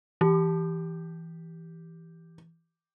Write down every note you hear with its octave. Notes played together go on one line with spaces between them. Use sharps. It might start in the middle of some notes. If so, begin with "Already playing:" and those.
E3 G4